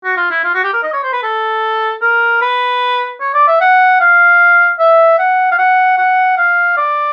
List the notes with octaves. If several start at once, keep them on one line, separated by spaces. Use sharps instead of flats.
F#4
F4
E4
F4
F#4
G4
A#4
D#5
C#5
C5
B4
A4
A#4
B4
C#5
D5
E5
F#5
F5
E5
F#5
F5
F#5
F#5
F5
D5